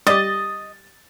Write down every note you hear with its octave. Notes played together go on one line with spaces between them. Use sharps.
G3 G4 D#5 A6